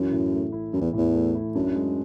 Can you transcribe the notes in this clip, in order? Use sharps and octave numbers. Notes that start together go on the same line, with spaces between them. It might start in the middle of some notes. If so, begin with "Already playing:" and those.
Already playing: F#2 E3
A2
A3
E4
F#2 E3
E2
E2 A2
A3
E4
F#2 D4
G#3